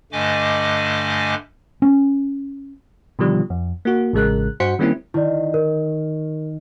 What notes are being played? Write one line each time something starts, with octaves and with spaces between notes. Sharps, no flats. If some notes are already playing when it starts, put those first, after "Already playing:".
G2 D3 A3 D#5 G#5 D6
C#4
B2 D3 D#3 F3 G3
F2
A#3 F#4
A1 C#3 G#3 A#4 F#6
G2 F#4 C5 F#5 B6 C#7
D#3 G3 A#3 C4 C#4 E4
D#3 E4 D5
A#4